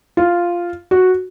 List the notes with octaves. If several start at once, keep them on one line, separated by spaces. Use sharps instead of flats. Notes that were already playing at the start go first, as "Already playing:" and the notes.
F4
F#4